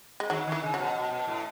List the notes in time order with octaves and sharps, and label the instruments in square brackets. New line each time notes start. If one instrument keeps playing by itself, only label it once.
[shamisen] G#3
[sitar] D#3 [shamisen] F#3
[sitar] D#3 [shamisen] E3
[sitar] C#3
[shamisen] F#3
[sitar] B2
B2
B2
A2